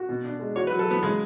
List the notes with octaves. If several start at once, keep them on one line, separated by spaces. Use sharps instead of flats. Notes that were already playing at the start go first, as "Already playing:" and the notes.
Already playing: F#4
B2
D4
G#3
F#4 C#5
F#3 B4
A4
F#3 B3
C#3 G#3